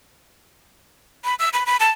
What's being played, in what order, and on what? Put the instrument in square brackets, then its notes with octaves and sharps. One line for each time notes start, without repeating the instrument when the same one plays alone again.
[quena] B5
E6
B5
B5
A5